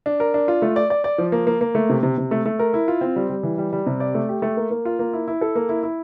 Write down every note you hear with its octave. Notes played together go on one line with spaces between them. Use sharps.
D4
A#4
D4
F4
A3
D5
D5
D5
F3
A#3
A#3
A#3
A3
C3
C3
C3
A3
A3
A#4
E4
F4
C4
G3
G3
E3
G3
G3
C3
D5
A3
G4
A3
A#3
A#3
F4
A#3
E4
E4
A4
A#3
E4
E4